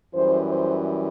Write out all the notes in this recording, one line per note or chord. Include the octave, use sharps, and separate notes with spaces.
F#2 E3 G3 C5
C5